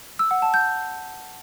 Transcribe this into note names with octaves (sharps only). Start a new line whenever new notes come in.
E6
F#5
A5
G6